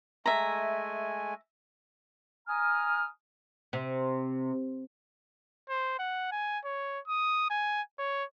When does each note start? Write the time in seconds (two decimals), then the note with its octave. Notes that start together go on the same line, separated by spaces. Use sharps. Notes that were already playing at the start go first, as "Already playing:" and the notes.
0.26 G#3 A3 E5 G#5 A#5
2.48 G#5 A#5 D#6 F6
3.73 C3
5.70 C5
5.99 F#5
6.32 G#5
6.65 C#5
7.08 D#6
7.51 G#5
7.99 C#5